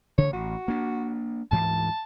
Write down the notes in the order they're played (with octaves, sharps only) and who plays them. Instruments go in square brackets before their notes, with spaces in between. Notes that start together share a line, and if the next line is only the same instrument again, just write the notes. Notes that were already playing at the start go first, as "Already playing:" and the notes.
[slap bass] A1 C#3 [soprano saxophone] C#5
[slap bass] A1 [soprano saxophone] F#4
[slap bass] A#3 D4
[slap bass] D2 G#2 E3 [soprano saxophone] A5